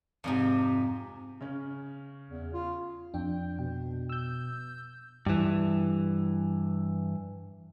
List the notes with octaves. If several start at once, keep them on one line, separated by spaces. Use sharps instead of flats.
F2 G#2 C3
C#3 C#4
E2
F4
F2 D4 G5
B2
E6 G6
G2 E3